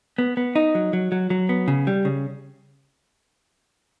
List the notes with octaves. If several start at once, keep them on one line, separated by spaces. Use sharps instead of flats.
B3
B3
D#4
F#3
F#3
F#3
F#3
B3
C#3
G3
C#3